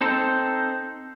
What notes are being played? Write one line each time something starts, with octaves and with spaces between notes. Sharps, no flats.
C4 D#4 A4 C5